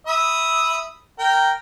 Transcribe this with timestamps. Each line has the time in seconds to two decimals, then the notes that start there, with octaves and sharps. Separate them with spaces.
0.07 E5 B5 D#6
1.19 A#4 G5